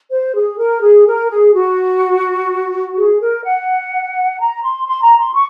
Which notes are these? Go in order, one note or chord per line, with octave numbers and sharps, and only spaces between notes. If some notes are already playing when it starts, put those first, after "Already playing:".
C5
G#4
A#4
G#4
A#4
G#4
F#4
G#4
A#4
F#5
A#5
C6
C6
A#5
C6
C#6